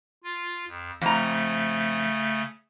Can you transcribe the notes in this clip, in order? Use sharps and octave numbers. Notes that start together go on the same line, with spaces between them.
F4
F2
F2 C#3 A3 A#5